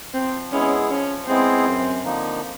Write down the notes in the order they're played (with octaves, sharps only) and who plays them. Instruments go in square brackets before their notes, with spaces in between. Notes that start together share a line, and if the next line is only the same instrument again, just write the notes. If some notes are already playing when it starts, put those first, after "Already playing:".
[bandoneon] F3 [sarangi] C4
[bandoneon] G#3 B3 E4 G#4 [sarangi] C#4
[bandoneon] F3 [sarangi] C#4
[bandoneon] G#3 B3 E4 G#4 [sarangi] C4
[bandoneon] F#2
D3 F3 A#3 D#4